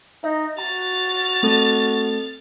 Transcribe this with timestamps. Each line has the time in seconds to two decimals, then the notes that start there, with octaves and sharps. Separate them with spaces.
0.24 D#4 E5
0.58 F#4 A#5 F6 A6
1.43 A3 C4 A4